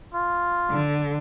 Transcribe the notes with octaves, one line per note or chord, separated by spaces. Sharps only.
F4
D3